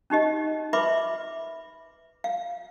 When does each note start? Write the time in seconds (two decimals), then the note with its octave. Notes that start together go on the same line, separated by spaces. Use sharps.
0.10 C#4 D#4 G4 D#5
0.73 B4 E5 B5 C6 D6
2.24 F5